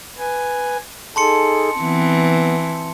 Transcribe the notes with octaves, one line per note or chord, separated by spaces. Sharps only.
B4 G#5
D#4 G#4 A4 A5 C6 C#7
E3 B3 C4